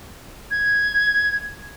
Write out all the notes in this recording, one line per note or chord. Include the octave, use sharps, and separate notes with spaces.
G#6